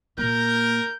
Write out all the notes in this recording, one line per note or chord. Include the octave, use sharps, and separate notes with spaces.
A#2 A#3 A#4 G6